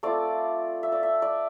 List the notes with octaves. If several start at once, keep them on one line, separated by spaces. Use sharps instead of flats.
A3 C4 F4 D5
E5
D5
E5
D5